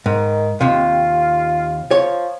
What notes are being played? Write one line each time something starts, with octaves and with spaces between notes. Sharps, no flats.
G#2 D#3
D#2 C3 F4
F3 C#5